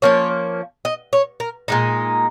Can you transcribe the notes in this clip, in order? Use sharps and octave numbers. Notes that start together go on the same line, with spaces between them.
F3 A#3 C#4 C#5
D#5
C#5
A#4
A#2 G#3 D#4